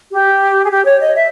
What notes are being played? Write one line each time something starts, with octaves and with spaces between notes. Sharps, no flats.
G4
G#4
G4
C#5
D#5
E5